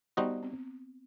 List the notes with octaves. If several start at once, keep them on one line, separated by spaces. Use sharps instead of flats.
G3 B3 D#4 F#4 C5 D#5
C4